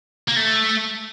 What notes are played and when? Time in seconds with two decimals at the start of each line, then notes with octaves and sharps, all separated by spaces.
0.28 A#3
0.36 A3